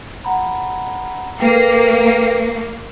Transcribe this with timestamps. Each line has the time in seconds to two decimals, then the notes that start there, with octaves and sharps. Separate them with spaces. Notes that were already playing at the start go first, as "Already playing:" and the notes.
0.25 F#5 A#5 B5
1.40 A#3 A4 B4 G5